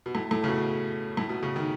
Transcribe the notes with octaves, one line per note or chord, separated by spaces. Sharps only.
B2
A2
A2
C#3
B2
A2
B2
C#3
D#3